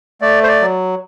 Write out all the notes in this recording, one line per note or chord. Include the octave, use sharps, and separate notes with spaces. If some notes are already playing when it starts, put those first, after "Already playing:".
A3 D5
C5
D5
F#3